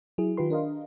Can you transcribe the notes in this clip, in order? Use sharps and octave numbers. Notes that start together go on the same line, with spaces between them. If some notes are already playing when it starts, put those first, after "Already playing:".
F#3 E4 G#4
D#3 F4 G4 B4 C6
D4 A#4 D#5 F5